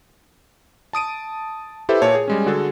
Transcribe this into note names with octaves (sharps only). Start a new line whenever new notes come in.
A5 D#6 D7 D#7
E4 G4 A4 B4 C5 E5
A#2 C#5 A5
G#4
G3 G#3 C#4
D3 F#4 G#4 A4